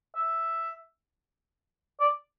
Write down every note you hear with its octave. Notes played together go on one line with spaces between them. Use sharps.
E5
D5